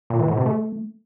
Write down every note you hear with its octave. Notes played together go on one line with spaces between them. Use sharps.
A#2
E3
A2
C3
A3